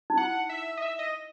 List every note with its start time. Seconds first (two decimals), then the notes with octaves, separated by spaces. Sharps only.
0.10 D#4
0.17 E4 F#5
0.49 E5
0.77 D#5
0.82 E5
0.99 D#5